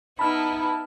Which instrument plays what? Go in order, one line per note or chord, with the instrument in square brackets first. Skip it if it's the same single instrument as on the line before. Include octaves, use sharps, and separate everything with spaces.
[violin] B3 E4 [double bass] D#4 [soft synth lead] A5 [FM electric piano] B5 F6